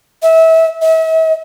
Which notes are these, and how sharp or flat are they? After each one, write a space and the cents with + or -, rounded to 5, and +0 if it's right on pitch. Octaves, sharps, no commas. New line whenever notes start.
E5 -25
E5 -40